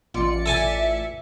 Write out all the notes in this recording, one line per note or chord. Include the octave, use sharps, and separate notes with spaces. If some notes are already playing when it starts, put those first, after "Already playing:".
A1 F4 D5 C#7
A4 E5 G#5 A5